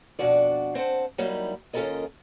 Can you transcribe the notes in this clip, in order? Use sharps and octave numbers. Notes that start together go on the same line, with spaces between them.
F2 B2 D4 F#4 D5
C4 C5 F#5 A5
F#3 G3 A#3 D#4 E4
D#2 C#4 F4 A4 A#4 D#5